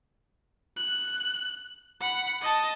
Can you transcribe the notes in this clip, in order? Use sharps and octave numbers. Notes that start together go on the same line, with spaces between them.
F#6
F#5 B5
D#5 A5